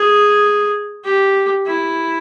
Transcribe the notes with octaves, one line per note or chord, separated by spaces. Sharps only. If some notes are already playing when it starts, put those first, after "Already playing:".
Already playing: G#4
G4
E4